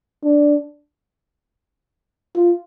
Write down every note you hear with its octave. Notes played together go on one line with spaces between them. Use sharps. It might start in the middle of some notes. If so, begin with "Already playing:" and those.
D4
F4